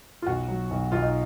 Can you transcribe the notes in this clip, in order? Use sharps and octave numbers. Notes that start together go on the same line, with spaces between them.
F4
B1 F#4
F#3
B1
B1 F4
D#4